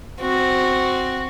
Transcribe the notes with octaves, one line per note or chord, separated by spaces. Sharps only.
C4 F#4